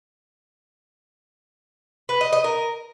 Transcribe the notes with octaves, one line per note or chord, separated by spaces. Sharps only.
B4
D#5
D#5
A#4